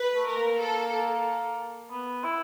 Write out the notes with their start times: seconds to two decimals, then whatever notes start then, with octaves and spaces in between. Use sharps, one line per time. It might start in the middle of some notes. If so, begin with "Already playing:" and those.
Already playing: B4
0.15 A3
0.26 A#4
0.36 A#3
0.59 A4
1.91 B3
2.24 E4